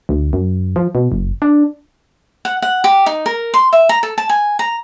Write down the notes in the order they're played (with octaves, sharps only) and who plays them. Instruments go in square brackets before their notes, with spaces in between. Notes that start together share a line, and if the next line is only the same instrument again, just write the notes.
[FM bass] D2
F#2
F3
B2
F#1
D4
[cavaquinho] F#5
F#5
G4
D#4
A#4
C6
E5
A#5
A4
A5
G#5
A#5